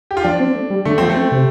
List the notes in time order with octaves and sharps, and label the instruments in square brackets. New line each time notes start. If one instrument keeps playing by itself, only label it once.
[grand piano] G4
F4
[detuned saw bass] F3 [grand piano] D4
[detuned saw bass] C4
A3
G3
[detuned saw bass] D3 [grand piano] A3
[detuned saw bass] F3 [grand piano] C4
[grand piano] A3
[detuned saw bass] C4
C3